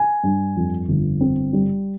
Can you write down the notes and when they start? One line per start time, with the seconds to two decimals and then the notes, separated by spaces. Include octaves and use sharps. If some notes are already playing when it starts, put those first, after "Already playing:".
Already playing: G#5
0.23 G2
0.56 F2
0.88 G1
1.21 C4
1.53 G3